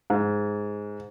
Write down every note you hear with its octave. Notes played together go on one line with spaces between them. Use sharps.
G#2